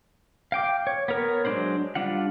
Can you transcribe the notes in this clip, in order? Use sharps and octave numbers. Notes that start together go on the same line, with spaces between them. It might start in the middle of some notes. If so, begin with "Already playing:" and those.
F5 G5 D6
C#5
B3 A#4 C#5
F#3 G#3 D4 B4 C5
G3 D4 F4 F#5